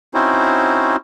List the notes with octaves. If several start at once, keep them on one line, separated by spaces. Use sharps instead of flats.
C4 C#4 D#4 E4 F#4 C5